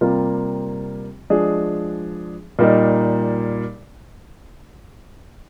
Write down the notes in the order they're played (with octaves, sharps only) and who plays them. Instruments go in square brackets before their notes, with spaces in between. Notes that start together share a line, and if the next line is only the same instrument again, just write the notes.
[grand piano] C3 G3 A#3 F4
F3 G#3 D4 G#4
A#2 G3 A#3 D#4